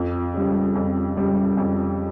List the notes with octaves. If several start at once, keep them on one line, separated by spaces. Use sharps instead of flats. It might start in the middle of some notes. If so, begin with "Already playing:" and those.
Already playing: F2
C#3 G3
F2
C#3 G3
F2